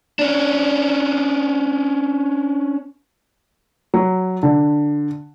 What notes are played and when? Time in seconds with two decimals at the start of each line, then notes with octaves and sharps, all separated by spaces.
0.19 C#4 D4
3.94 F#3
4.43 D3